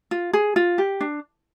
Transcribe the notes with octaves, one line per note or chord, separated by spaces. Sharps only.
F4
G#4
F4
G4
D4